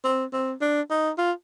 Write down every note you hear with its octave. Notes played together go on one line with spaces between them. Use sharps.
C4
C4
D4
D#4
F4